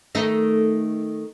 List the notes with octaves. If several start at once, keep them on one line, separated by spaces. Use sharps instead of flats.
D#3 A3 D#4